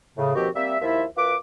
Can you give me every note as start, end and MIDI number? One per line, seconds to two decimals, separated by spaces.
0.17 0.33 45
0.17 0.33 49
0.35 0.49 39
0.35 0.49 47
0.35 0.49 53
0.35 0.49 60
0.35 0.49 66
0.35 0.49 67
0.55 0.77 55
0.55 0.77 58
0.55 0.77 60
0.55 0.77 76
0.81 1.04 39
0.81 1.04 53
0.81 1.04 64
0.81 1.04 65
0.81 1.04 76
1.17 1.35 42
1.17 1.35 65
1.17 1.35 71
1.17 1.35 86